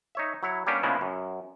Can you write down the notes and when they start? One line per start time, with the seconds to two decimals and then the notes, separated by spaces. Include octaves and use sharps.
0.15 D#4 C#5 E5
0.43 F#3 E4 C#5
0.67 G3 A#3 B3 C#4 D4 G4
0.83 C#3 F3 G#3 A#3 B3 E4
1.01 F#2